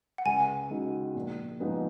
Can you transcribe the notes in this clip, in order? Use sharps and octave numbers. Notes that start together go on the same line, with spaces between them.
F#5
C#2 G#5
C#3 G#3 D#4 F#4
A#1
G#2 F3 B3 D#4